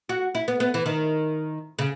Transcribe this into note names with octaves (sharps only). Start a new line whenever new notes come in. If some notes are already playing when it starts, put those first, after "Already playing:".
F#4
E4
B3
B3
E3
D#3
C#3